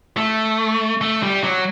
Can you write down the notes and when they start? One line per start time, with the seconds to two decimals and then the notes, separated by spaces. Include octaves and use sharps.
0.17 A3
1.01 A3
1.23 G3
1.43 F#3